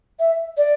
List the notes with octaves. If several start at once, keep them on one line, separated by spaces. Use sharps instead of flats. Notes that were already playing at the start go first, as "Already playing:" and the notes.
E5
D5